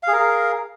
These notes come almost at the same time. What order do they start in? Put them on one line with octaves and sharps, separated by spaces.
F5 G#4 A#4